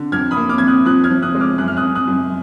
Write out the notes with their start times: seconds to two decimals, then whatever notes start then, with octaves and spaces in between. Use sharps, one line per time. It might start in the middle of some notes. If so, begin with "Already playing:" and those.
Already playing: D3
0.12 F2 F6 G#6
0.31 B5 D#6
0.37 A#3
0.49 D6 F6
0.58 F2 G#6
0.67 D#6 F#6
0.85 F3 D#6 F#6
1.04 F6 G#6
1.10 F3
1.22 D#6 F#6
1.35 G#3
1.40 D6 F6
1.58 F#2 F#6
1.68 F6
1.77 D#6 F#6
1.83 F#2
1.95 D#6 F#6
2.07 F#2